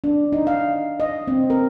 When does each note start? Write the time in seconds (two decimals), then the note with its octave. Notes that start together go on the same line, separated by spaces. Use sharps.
0.04 D4
0.32 D#4
0.47 F5
1.00 D#5
1.28 C4
1.50 A#4